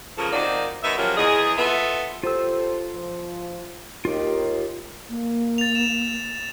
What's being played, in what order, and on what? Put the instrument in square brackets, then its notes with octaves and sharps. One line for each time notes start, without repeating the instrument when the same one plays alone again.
[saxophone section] C#3 F3 A#3 A4 A#4
A#2 D#3 C4 F#4 D5 F5
F#2 B3 D#4 E5
F3 F#3 A#3 C#4 G4 A#4
E2 G#4 D#5
B3 F4 A4 D#5 E5
[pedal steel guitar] F4 E6 [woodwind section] G4 A4 C5
[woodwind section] F3
[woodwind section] D#2 D#3 [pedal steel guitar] F4 G4
[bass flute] A#3
[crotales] A6 F7
E7